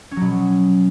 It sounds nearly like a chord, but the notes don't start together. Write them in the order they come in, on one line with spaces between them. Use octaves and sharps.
C#4 F#3 B2